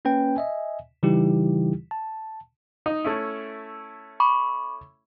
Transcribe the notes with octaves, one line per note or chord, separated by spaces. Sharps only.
A#3 C#4 B4 G5
D#5 E5 G#5
C#3 E3 G3 D#4 E4 G4
A5
D#4
A3 C#4 E4
B5 C#6 D6